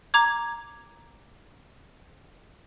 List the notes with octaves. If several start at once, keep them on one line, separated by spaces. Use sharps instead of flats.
A#5 D6 G#6